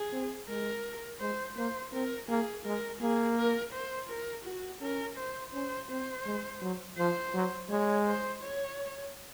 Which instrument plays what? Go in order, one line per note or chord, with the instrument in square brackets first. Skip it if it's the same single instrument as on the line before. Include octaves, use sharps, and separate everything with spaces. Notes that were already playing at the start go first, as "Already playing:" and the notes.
Already playing: [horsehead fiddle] G#4
[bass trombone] C4
[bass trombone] G#3 [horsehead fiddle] A#4
[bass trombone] G#3 [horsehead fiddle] C5
[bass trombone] A#3 [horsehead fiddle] C5
[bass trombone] C4 [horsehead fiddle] A#4
[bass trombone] A#3 [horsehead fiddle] G#4
[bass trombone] G#3 [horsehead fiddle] A#4
[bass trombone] A#3 [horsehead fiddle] G#4
[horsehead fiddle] A#4
C5
A#4
F#4
[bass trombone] C#4 [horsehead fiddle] A#4
[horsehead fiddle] C5
[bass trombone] C#4 [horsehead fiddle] C5
[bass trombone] C4 [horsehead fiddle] C5
[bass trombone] G#3
F#3
[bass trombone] F3 [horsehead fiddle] C5
[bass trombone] F#3
[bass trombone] G#3 [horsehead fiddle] C#5
[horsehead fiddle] C5
C#5